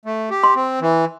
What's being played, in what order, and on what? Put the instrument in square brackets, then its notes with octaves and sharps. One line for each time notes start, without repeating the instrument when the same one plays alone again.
[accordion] A3
G4
[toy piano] C6
[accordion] C4
E3